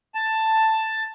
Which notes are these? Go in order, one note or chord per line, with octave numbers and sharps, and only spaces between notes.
A5